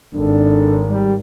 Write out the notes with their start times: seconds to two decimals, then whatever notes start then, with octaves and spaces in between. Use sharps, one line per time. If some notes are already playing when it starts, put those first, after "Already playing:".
0.14 G#1 D4 A4
0.89 G3